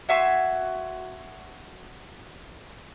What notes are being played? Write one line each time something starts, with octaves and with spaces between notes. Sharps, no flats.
F#4 E5 G#5 C6